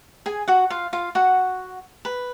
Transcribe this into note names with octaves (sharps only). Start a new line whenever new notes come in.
G#4 G#5
F#4 F#5
F4 F5
F4 F5
F#4 F#5
B4